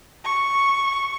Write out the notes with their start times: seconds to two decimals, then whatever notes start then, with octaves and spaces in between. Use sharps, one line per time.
0.25 C#6